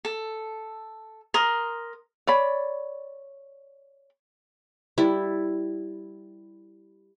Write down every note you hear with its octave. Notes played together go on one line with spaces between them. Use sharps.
A4
A#4 C6 D#6
C#5 D5 B5
G3 E4